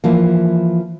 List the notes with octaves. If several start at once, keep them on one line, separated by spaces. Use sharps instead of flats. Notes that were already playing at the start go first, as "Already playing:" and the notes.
E3 F3 A#3